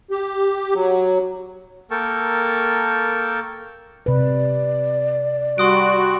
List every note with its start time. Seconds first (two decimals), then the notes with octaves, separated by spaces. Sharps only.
0.11 G4
0.74 F#3
1.91 A#3 A4 A#4 G5 A5 C#6
4.06 C3 B4 D5
5.58 G3 F#4 C6 D#6 F#6 D7